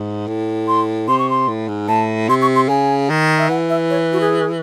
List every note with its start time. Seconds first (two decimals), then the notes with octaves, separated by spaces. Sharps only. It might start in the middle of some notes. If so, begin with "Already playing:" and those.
Already playing: G#2
0.27 A2
0.68 C6
1.08 C3 C6
1.19 C#6
1.30 C6
1.48 A2
1.68 G#2
1.88 A2 A5
2.29 C3 C6
2.42 C#6
2.56 C6
2.69 C#3 G#5
3.10 D#3
3.38 E5
3.49 E3 F#5
3.69 E5
3.90 C#5
4.12 F#4
4.21 G#4